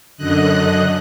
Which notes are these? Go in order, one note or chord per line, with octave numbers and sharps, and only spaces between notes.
F#2 D3 D#5 F#6